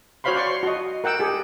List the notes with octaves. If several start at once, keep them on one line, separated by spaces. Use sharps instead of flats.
F#4 C5 C#5 F5 B5 C6
D5 C6 C#6
C6
F#4 D#5
A#4 F#5 G5 E6
G4 G#4